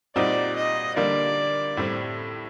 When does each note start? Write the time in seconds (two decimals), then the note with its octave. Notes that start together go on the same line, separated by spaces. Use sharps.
0.16 A#2 G3 C4 D#4 F#4 D5
0.56 D#5
0.97 D3 G3 A#3 D5
1.77 A2 G3 C4